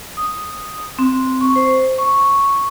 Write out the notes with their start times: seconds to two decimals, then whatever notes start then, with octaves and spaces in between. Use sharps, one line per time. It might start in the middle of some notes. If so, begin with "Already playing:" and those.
0.17 D#6
0.99 C4
1.41 C#6
1.56 C5
1.98 C#6